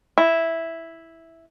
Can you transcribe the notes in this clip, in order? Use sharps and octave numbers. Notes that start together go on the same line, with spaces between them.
E4